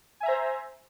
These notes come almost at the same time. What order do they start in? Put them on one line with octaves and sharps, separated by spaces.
G#5 E5 A#5 C5